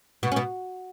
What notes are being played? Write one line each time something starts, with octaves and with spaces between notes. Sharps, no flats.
B2 B3 F#4
C#4
B2 B3